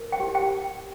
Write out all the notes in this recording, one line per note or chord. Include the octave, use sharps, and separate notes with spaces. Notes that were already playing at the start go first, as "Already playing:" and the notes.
Already playing: A#4
G5
G4
G5